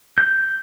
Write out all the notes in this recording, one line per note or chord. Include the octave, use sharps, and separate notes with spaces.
G6